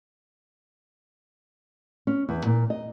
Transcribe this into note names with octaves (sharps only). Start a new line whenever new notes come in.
C#4
E2
A#2
D#5